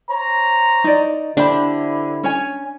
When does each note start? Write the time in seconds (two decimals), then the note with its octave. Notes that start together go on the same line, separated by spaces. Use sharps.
0.11 C5 C#5 A#5
0.84 D#4 D5
1.37 D3 D4 E4 G4 C5 B5
2.23 C#4 C#5 G#5